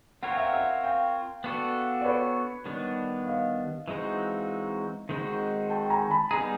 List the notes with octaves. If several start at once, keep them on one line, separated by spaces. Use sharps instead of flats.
C4 F4 A#4 C#5 F#5
G5
E5 F#5
E5 F#5
F5 G5
B3 D4 F#4 A4
D5
B4 C#5
D#3 G3 B3 D4
D#5 F5
E3 G#3 C4 D#4 F#4
D#3 G#3 C4 D#4 F#4
G5 A5
G#5 A#5
A5 B5
G3 B3 D#4 G#4 G#5 A#5